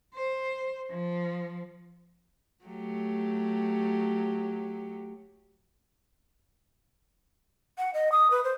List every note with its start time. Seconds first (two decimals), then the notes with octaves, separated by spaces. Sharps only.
0.14 C5
0.91 F3
2.65 F#3 A3 G4
7.78 F#5
7.94 D#5
8.12 D#6
8.31 B4
8.44 C5